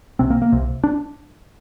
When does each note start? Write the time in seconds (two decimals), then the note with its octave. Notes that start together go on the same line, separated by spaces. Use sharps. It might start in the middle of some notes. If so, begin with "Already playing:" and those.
0.19 C2 C3 C4
0.30 A#3
0.42 A#3
0.52 C2 C3
0.84 D4